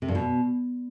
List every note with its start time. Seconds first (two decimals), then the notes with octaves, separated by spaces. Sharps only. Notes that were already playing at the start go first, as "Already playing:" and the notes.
0.02 C3
0.08 G2
0.15 B2